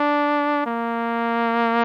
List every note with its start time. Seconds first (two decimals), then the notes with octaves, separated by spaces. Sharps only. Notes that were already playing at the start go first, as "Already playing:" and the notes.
Already playing: D4
0.67 A#3